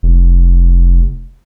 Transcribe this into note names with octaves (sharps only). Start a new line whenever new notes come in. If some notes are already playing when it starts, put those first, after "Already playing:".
F1